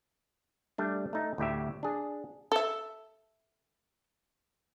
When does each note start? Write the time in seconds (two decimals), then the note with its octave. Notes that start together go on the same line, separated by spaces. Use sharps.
0.78 G3 A3 D4
1.13 A3 D#4
1.38 D2 A2 G4 E5
1.83 D4 G#4
2.52 A4 E5